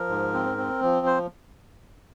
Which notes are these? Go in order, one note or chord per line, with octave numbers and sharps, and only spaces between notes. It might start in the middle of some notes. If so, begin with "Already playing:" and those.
Already playing: F3 A#4
G#2
C4
C4
F3
C5